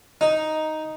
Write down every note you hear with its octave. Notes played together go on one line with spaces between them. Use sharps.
D#4